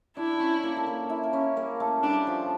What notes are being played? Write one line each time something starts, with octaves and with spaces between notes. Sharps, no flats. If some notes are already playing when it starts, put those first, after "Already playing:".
D4 E4 D5
C#4 C#5
A#3 A#4
A4
A#3 A#4
E4 E5
A#4
C#4 C#5
A#3 A#4
A3 A4
G3 D4 G4
F3 F4